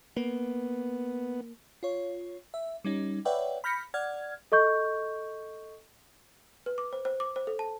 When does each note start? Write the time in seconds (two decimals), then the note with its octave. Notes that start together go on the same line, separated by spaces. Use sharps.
0.16 A#3 B3
1.83 F4 C#5
2.54 E5
2.84 G3 C#4 D#4
3.25 B4 C#5 D5 E5 F#5 G5
3.64 B5 F6 G6 A#6 B6 C#7
3.94 D5 F#5 F6 G#6
4.52 A4 D#5 C#6 G6
6.66 B4
6.78 D6
6.93 C5
7.05 C5
7.20 D6
7.36 C5
7.47 A4
7.59 A5